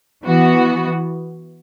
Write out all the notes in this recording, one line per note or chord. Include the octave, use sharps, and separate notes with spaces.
E3 B3 F#4